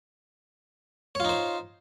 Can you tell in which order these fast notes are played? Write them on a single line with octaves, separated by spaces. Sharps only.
C#5 F4 D#4 C5